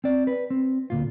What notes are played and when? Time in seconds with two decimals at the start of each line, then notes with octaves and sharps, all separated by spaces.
0.04 C4 D5
0.27 B4
0.50 C4
0.90 D2 A#2 F4